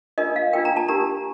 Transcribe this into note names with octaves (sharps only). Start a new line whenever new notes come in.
D4 F4 A#4 D#5
F5
D4 F4 A#4 G5
A#5
A5
D4 G4 A#4 A#5